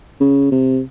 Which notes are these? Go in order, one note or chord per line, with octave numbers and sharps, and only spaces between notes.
C#3
C3